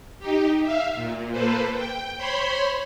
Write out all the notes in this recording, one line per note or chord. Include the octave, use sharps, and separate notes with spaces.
D#4 G4
E5 F5
A#2
A#3 A4 B4 C5
G5
C5 C#5 B5 C6